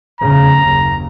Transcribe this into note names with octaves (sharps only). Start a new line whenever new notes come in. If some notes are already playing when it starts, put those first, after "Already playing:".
F1 E2 C#3 A#5
F#1 D#2 C#3